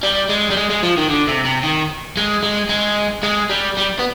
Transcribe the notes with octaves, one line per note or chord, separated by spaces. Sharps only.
G3
G#3
G3
G#3
G#3
F3
D#3
D3
C3
C3
D#3
G#3
G#3
G#3
G#3
G3
G3
B3